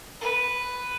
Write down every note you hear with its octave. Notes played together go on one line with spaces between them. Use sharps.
B4